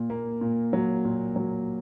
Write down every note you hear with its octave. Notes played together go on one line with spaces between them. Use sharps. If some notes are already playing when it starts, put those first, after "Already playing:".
Already playing: A#2
A#3
A#2
F#3
A#2
F#3